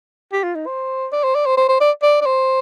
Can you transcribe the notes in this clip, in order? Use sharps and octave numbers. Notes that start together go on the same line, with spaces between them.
G4
F4
D#4
C5
D5
C5
D5
C5
C5
C5
D5
D5
D5
C5